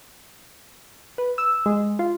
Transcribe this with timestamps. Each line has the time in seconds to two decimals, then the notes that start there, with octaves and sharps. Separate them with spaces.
1.18 B4
1.38 E6
1.66 G#3
1.99 F4